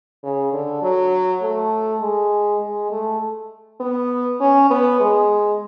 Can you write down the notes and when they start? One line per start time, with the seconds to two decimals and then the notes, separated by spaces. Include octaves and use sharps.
0.23 C#3
0.53 D3
0.83 F#3
1.42 A3
2.02 G#3
2.62 G#3
2.91 A3
3.81 B3
4.40 C#4
4.71 B3
5.00 G#3